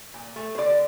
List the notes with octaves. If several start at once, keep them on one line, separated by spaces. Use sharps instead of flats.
A#2
A3
C5
D3 D5